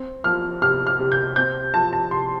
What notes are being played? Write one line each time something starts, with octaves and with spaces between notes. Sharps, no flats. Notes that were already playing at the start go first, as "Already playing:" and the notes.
Already playing: C4
F3 F6
C3 F6
F6
C3
G6
C4 G6
F3 A5
A5
C3 C6